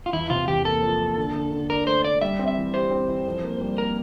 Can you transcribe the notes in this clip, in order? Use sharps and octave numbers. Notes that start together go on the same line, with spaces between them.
F4
E2 E4
C3 F4
E2 G4
A#3 A4
F3
A#3
D3
D3
D3
D4 A#4
A3 C5
D4 D5
G3 E5
C4
E5
E3
G4 C5
C4
E3
F2
A#3
G3
A#3 A#4